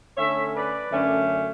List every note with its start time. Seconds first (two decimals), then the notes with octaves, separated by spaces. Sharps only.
0.17 D3 A3 C#4 C#5 E5
0.55 B4 D5
0.92 F#2 D3 A3 C#4